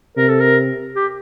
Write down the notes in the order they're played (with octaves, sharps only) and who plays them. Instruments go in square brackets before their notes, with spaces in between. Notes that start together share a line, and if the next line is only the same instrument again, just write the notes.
[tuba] C3 [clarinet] A#4
[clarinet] A4
A#4
G4